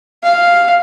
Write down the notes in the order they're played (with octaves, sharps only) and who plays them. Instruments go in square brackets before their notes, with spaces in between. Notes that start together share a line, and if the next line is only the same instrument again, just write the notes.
[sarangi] F5